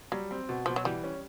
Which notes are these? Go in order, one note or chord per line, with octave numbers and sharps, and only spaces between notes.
F#3 G3
C4
B2
B2 F3
F#3
E3 G3
C#4